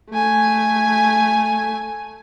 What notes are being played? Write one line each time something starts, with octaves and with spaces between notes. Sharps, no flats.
A3 G#5